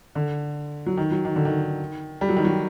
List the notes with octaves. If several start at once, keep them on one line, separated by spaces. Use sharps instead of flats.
D3
F#3
D#3
F#3
D#3
D3
D#3
G3
F#3
D#3
F#3